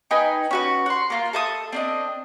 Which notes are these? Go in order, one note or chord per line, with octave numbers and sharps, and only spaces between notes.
D#4 B4 G5 G#5
C#4 F#4 B4
F#5 C6
A#3 F4
A4 E5 D#6
C4 D4 D#5